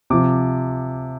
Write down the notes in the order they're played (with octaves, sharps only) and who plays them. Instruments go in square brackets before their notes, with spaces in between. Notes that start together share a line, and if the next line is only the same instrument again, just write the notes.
[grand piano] C3 F3 D6